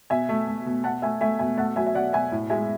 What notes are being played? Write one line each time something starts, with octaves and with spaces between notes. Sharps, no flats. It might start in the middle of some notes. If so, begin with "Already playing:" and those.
B2 E5 G#5
A3
A3
B2
B2 F#5 A5
A3 E5 G#5
A3 E5 G#5
B2 E5 G#5
A3 F#5 A5
F#3 E5 G#5
E5
B2 D5 F#5
B2 E5 G#5
A2
G#3 E5 G#5